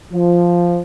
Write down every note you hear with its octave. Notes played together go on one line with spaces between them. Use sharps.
F3